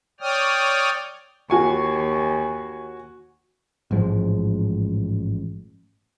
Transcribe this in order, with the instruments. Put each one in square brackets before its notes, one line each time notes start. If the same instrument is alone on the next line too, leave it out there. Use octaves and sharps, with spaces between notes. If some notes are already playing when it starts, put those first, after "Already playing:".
[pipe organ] C#5 D5 G5 D#6 F6
[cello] D#2 [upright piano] F#4 G#5 C#6
[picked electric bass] A1 G#2 F3 G#3